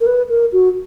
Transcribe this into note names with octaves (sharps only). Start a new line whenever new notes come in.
A#4
B4
A#4
F#4